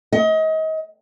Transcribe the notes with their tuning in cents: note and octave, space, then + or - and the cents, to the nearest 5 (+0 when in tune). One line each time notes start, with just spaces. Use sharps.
D#5 +30